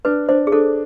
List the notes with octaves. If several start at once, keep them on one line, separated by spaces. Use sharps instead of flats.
D4 B4
D4 C5
G#4
D4 A4